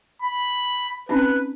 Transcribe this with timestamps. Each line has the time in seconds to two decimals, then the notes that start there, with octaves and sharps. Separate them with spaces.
0.22 B5
1.09 C4 C#4 D#4 B4